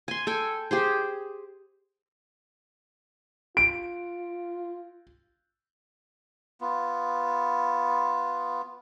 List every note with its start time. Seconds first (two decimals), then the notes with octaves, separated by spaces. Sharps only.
0.08 G#5 C6
0.27 A4 G5 G#5
0.71 G4 G#4 C5
3.57 F4 D7
6.61 B3 F4